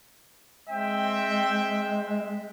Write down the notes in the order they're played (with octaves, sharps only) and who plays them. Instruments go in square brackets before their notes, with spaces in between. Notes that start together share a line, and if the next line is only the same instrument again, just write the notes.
[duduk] G#3 [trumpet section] C4 E5 G5